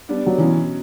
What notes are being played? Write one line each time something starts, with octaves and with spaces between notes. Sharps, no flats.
G3 B3 D4
F#3
B2 E3 F#3 C#4